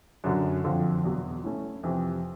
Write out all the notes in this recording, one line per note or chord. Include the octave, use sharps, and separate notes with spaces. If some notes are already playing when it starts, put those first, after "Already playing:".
F#2 D3 F#3
F2 D3 F3
E2 B2 F#3
A3 C#4 E4
F2 C3 E3